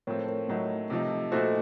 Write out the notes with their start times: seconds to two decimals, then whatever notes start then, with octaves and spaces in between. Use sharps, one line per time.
0.07 A2 F3 A3 C4 A#4 C#5
0.28 A#4 C#5
0.48 A2 F#3 A3 D#4
0.90 C3 F3 A3 D#4
1.32 A#2 A3 D#4 F#4 A4 C5